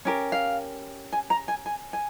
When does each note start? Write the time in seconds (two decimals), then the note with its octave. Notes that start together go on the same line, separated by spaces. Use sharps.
0.05 C#4 G4 A#4
0.32 F5
1.13 G#5
1.30 A#5
1.48 G#5
1.66 G#5
1.93 G#5